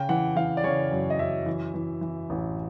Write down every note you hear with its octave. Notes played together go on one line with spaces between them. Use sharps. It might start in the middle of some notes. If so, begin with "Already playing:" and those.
Already playing: C#3 G5
E3 F#5
E3 F5
D5
C#3 C#5
F#2
D#5
F#2 E5
E3
E3
E3
A1